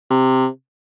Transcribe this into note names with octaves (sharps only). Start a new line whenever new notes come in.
C3